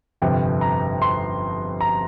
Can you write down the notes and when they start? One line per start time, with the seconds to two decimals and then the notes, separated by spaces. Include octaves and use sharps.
0.22 G1 F2 C3 G5
0.61 A#5
1.02 C6
1.81 A#5